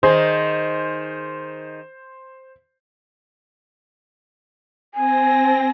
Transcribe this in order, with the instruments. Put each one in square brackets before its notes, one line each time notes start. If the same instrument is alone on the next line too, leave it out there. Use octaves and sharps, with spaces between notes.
[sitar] D#3 G#4 D#5 [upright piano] C5
[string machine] C4 A#6 [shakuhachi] G#5